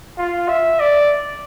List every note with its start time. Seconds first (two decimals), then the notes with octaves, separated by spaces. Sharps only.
0.18 F4
0.49 E5
0.80 D5